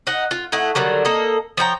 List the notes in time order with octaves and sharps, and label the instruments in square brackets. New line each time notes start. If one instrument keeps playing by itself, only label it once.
[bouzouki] D#4 D#5 F#5
F4
A3 D#4 E4 F#5
D3 D#3 F#3 G3
A#3 A4 D#5
F3 C#5 G5 A#5